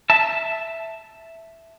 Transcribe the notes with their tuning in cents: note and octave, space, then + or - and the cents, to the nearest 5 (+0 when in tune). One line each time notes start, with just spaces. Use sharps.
E5 +0 A5 +0